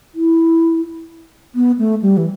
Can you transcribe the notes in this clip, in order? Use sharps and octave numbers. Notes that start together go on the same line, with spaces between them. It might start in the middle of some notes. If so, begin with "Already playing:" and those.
E4
B3
A3
G3
E3